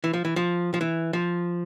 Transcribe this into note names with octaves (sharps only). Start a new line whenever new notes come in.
E3
F3
E3
F3
F3
E3
F3